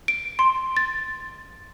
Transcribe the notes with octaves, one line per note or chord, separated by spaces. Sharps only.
D7
C6
A6